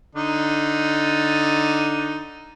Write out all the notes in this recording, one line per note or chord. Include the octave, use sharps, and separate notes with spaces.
D3 D#4